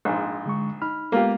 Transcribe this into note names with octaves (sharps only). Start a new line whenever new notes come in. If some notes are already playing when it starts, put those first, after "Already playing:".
A#1 G#2
D3 G#3 C#6
D#4 B5 F6
G#3 A#3 B3 F4 G4